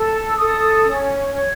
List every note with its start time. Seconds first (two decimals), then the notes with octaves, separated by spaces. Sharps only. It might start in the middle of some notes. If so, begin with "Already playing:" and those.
Already playing: A4
0.29 E6
0.38 A4 D#6
0.85 C#4
1.31 C#5